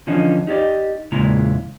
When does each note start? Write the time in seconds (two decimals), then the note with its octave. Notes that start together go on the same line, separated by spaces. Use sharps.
0.07 D3 E3 F3 C#4 D#4
0.47 D#4 G4 A4 D5 D#5
1.12 E2 A#2 C#3 G#3 E4 A#5